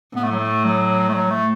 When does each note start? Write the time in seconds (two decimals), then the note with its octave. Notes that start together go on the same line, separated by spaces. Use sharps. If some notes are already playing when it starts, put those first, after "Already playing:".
0.16 A2 B3
0.23 A3
0.31 F#3
0.39 A3
0.65 F#3
1.09 A3
1.14 F#3
1.30 A3